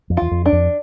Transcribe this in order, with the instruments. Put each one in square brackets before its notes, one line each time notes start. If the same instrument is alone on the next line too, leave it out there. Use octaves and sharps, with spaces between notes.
[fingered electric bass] F2
[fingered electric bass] E2 [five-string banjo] F4
[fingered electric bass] F2
[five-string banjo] D4
[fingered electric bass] F2